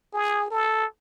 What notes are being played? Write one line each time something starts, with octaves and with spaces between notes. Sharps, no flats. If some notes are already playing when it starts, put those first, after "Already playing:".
G#4
A4